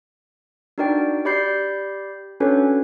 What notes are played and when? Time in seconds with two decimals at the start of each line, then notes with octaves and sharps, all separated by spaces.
0.78 D4 D#4 F#4 A#4 D5 G5
1.25 G4 D5 B5 G6 C7
2.40 C#4 D4 F#4 A4 B4 C#5